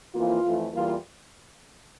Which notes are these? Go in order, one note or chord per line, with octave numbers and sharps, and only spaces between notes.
F2 E3 A#3 F4
F2 E3 A3
E2 E3 G3 A#3 F4